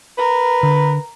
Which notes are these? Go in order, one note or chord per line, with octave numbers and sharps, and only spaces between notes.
A#4 B4
D3